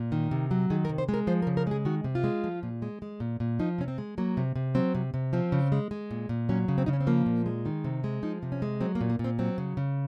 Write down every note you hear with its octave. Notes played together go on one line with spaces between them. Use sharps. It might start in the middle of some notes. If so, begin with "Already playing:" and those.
Already playing: A#2
D#3
C3
F#3
D#3 G#4
A#4
C3
C5
G#3
A#4
F3 C5
A#4
C#3
A#4
G#3 G#4
D#3 F#4
C3
F4
G#3
F3
A#2
G#3
G#3
A#2
A#2
F3 D#4
C3 C#4
C4
G#3
F#3 A#3
C3
C3
F#3 C4
C3
C3
F3 C4
C#3
G#3
G#3
A#2
A#2
F#3 C#4
C#3
C4
C#3 D#4
C#4
C4
F3 A#3
A#2
G#3
D#3
C3
G#3
F3 D#4
C3
C#4
G#3
F#3 C4
A#3
A#2
A#3
A#2
C4
F#3 C4
C#3
C#3